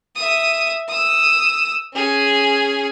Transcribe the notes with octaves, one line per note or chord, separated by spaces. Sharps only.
E5 D#6
D#6 E6
C#4 G#4